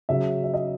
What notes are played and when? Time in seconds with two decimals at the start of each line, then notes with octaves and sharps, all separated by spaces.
0.09 C#3 F#3 E5
0.44 E5
0.54 D#5